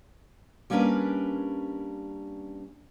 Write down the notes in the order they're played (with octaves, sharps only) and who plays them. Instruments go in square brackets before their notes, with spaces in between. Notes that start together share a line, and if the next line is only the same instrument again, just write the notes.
[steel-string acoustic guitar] G3 A#3 C#4 D4 A#4 B4